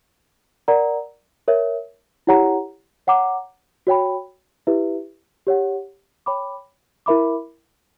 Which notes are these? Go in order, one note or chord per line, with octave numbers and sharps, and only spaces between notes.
A#4 D5 F#5 A#5
A#4 C#5 E5
E4 G4 C#5 F#5 A#5
C#5 F#5 A#5 D6
F#4 C#5 G5 B5
E4 G4 B4 E5
G4 C#5 F#5
C#5 G5 B5 D6
E4 A#4 E5 B5 D6